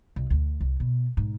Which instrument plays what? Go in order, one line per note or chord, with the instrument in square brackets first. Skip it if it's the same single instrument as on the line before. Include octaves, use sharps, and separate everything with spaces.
[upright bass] C2
D2
C2
B2
G#2